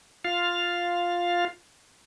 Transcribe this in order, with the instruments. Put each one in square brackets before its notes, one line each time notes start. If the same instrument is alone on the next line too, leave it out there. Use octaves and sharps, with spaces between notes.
[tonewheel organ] F4 F5